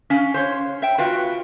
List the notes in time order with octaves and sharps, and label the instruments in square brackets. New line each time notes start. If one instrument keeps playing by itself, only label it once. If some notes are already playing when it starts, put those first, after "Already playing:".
[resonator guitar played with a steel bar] C#4 F5
C5 C#5
[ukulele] E5 G5
[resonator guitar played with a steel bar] B3 F#4 G5 [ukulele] F4 B4 F5